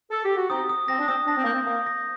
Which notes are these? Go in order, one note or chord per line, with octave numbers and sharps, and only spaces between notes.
A4
G4
F#4
C4 D#4 D#6
D#6
C4 A#6
D4
C4 D#6
D4 A#6
C4
A#3 G6
C4
A#3 D#6
A#6